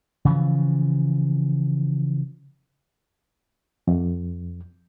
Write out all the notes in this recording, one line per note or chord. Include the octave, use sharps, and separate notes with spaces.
C#3 E3 F3
F2